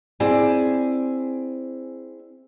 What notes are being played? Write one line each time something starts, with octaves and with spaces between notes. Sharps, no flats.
C4 E4 G#4 D5 G#5